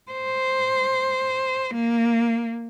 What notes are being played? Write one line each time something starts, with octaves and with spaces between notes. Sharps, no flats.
C5
A#3